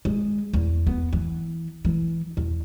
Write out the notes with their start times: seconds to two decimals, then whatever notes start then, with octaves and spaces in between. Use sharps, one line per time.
0.05 G#3
0.53 E2
0.87 B3
1.13 E3
1.85 E3
2.37 E2